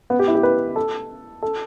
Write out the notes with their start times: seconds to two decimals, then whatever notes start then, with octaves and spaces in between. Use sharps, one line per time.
0.10 B3
0.19 G4
0.28 E4
0.35 G4
0.43 B4
0.76 A4
1.43 A4